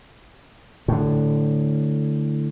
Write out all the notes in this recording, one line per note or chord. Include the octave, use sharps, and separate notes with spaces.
A2 D3